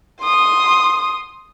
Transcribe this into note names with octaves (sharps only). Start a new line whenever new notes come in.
C6 D#6